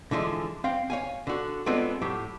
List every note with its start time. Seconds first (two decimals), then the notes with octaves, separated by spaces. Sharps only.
0.11 D3 E3 F3 G#3
0.64 C4 F5 G5
0.90 C#5 F5 G#5
1.27 D3 F#4
1.66 G#3 B3 C4 D4 F4 A4
2.02 A2 F#3 G4